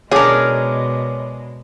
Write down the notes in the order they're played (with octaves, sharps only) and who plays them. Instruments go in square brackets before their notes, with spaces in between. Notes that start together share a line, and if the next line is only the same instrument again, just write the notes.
[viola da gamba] B2 G#3 [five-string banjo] C#4 D4 [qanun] G#4 A#4 [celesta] C#5 D6